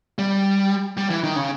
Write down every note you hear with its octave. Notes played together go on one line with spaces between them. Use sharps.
G3
G3
E3
D#3
C#3